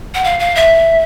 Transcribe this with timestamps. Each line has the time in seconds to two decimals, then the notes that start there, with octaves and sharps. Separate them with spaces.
0.15 F#5
0.24 F5
0.39 F5
0.55 E5